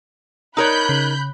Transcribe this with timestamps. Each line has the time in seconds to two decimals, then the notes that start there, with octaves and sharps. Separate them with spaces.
0.57 D#4 A#4 C#5 B5 F#6 G6
0.89 C#3